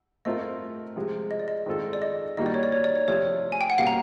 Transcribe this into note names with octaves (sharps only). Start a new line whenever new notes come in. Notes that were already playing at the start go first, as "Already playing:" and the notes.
A3 C4 F4 A#4 D#5
C3 F3 G#3
D#5
D5
D#5
D#3 G#3 C4 F4 A4
D5
D#5
D#3 G3 A#3 D#4 F#4 D#5
D5
C#5
D5
C#5
D5
C#5
C3 F3 A3 C#5
G#5
G5
F#5
B2 G3 A#3 C#4 F5
A#5